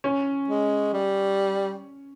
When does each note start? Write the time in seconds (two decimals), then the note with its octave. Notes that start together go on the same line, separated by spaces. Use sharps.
0.04 C#4
0.48 G#3
0.94 G3